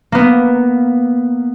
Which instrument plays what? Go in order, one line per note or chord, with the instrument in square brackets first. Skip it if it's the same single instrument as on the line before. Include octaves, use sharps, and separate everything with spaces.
[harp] A#3 B3